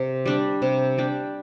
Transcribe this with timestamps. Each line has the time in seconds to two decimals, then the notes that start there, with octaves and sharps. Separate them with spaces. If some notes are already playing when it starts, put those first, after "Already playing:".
Already playing: C3
0.25 G3 D4 G4
0.62 C3
0.98 G3 D4 G4